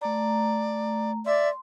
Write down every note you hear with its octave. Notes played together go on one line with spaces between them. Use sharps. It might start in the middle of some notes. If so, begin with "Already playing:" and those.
A3 D5 A#5
D5 E5 C6